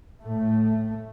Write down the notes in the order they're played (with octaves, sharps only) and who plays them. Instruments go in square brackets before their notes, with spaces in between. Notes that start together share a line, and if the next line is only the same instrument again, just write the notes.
[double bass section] A2 A3